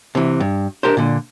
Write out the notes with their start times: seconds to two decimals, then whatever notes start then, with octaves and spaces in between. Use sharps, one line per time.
0.15 C3 E3
0.40 G2
0.83 D4 G4 A#4 C5
0.97 A#2 D3